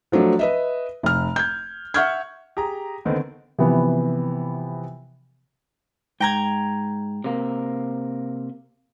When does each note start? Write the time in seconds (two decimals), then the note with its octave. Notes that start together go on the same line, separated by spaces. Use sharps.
0.12 F3 F#3 A3 D4
0.39 B4 D#5 E5
1.03 F1 F6
1.36 G6 G#6
1.94 E5 F#5 C#6 F6 G6 G#6
2.57 G4 G#4 A#5
3.05 D3 D#3 B3 C4 D#4
3.58 C3 E3 F3 B3
6.20 G#2 G5 A#5 G#6
7.24 C3 A#3